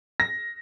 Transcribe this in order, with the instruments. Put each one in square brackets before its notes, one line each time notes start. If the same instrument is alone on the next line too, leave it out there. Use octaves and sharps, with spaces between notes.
[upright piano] A#6